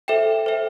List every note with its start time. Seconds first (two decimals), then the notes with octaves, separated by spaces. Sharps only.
0.08 A4 C5 E5 G5 E7
0.46 A4 C5 E5 G5